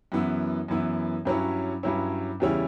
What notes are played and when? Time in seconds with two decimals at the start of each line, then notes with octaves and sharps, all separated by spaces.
0.12 F#2 E3 B3 E4
0.68 F#2 E3 B3 E4
1.25 G2 F#3 C#4 E4
1.83 G2 F#3 C#4 E4
2.40 E2 C#3 G3 C#4 E4